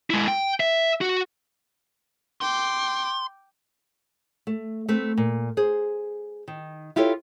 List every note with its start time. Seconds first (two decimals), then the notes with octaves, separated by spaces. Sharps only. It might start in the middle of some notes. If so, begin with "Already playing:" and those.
0.10 G#3 E4
0.28 G5
0.60 E5
1.01 F#4
2.41 G5 C6 D6
4.47 A3
4.89 A3 C4 B4
5.17 A#2
5.57 G#4 C5
6.48 D#3
6.96 E4 F4 G4 A4 C#5